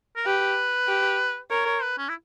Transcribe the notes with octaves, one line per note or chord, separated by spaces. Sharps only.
A#4
G4 B4
G4
A#4 C#5
C#5
B4
C#4
E4